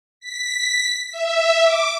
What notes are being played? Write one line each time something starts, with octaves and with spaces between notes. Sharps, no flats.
B6
E5
D6